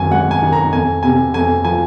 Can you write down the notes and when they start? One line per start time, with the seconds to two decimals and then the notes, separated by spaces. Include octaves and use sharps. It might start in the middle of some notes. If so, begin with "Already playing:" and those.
Already playing: G#1 F#2 G#5
0.11 G#3 F#5
0.31 G#5
0.42 D#3
0.53 A#5
0.72 F2 G#5
1.03 C3 G#5
1.34 F2 G#5
1.64 F3 G#5